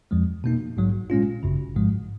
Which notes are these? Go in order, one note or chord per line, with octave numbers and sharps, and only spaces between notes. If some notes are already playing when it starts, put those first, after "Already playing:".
F2 F3 G#3
B2 A#3 D#4
A#1 G#2 F#3
A#2 G#3 C#4 F4
G#1 F#2 C#3
G#1 G#2 F3 G#3